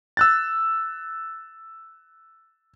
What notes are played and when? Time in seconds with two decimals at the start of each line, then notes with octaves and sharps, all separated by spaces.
0.17 E6 F#6 A6